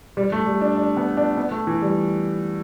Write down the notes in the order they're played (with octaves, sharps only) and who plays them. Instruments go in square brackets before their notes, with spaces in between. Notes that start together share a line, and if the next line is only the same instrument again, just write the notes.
[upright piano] G3
A3
G3
D4
D4
B3
D4
B3
A3
E3
G3